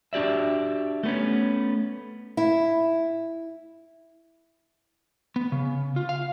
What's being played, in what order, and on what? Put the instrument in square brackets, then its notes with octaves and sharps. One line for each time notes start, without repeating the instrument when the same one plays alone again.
[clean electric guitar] D4 F#4 G4 D5 E5
A3 B3 C#4
[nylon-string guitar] E4
[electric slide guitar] B3
C#3
F4
F5